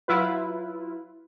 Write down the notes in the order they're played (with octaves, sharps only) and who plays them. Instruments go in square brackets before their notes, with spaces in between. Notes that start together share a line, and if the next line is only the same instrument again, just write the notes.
[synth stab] F#3 E4 F4 B4